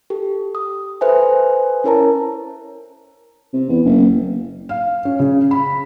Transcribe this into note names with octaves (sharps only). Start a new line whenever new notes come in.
G4 A4
D#6
A4 B4 C5 E5 G#5
C#4 E4 A#4 C#5 A5 A#5
C3
E2
F#1
F5
C#4
C#3
B5